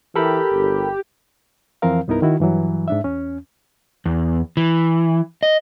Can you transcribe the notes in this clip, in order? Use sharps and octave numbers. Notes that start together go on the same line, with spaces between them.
E3 G4 A4 A#4 B5
G1
F2 E3 F3 C4 A#4 F5
C2 G2 B3 D#4 E4 A#4
D#3 E4 F#4
G2 E3 F#3
G#2 D4 E5
E2 C#4
E2
E3
D#5